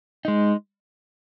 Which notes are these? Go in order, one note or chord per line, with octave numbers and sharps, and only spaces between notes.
G#3 D#4